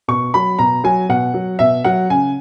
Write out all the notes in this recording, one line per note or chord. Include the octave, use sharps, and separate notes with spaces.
B2 C#6
F#3 B5
B2 A#5
F#3 G#5
B2 F#5
F#3
B2 E5
F#3 F#5
C#3 G#5